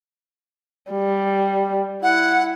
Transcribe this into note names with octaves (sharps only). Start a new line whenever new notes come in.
G3
E4 F#5